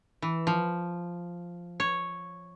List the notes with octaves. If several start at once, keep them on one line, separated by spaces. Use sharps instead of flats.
E3
F3
C#5